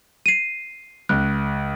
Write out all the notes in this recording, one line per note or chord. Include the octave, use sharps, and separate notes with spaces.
C7 D#7
C#2 F#6